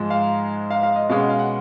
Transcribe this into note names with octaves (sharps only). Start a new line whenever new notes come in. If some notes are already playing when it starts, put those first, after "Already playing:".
Already playing: G#2 F3 G#3
F5
F5
F5
D#5
B2 G#3 C#4 F5
F#5
F5
F#5